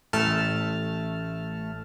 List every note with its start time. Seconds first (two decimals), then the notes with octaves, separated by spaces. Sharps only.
0.13 A1 A3 A5 F6